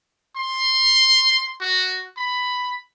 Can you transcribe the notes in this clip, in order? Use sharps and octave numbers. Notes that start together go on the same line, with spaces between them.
C6
F#4
B5